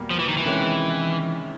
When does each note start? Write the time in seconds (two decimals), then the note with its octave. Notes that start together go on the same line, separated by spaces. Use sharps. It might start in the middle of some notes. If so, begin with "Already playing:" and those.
Already playing: E2 B2 G3 A#3
0.11 F3
0.19 E3
0.29 D#3
0.37 E3
0.45 C3 D#3 G#3 C#4 E4